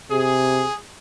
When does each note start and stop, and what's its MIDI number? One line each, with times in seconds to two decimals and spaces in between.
0.11 0.65 48
0.11 0.76 68